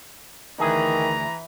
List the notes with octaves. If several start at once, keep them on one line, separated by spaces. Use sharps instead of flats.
D2 D#3 E3 G#4 A#5